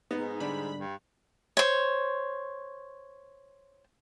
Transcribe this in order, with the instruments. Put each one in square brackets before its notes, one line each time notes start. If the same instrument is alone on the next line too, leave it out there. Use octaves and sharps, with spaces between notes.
[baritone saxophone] G#2 [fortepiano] B3 [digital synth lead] D#4
[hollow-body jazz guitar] D3 G3 D4 [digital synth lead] B5
[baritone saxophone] G2
[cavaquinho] C5 C#5